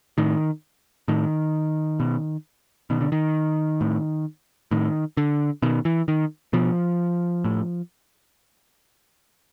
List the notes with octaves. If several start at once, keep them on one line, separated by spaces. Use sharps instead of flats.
A2 D#3
A2 D#3
B2
B2 D#3
D3
D#3
A2
A2 D#3
D3
B2 D#3
E3
D#3
B2 F3
A2